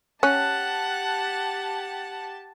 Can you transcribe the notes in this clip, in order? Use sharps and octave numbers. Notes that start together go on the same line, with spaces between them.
C#4 G4 F#5 A5 F#6